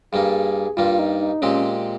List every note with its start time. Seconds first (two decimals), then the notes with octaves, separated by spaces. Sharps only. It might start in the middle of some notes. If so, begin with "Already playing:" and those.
0.12 G2 G3 A#3 G#4
0.77 G2 G3 A#3 F4
0.91 F4
0.99 D#4
1.20 D#4
1.42 A#2 G#3 C4 C#4 G4